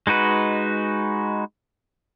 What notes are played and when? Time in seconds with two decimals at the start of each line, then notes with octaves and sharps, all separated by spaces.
0.07 G#3 D#4 F#4 B4